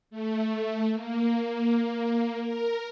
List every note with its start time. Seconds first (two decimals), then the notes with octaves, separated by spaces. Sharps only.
0.11 A3
0.93 A#3
2.42 A#4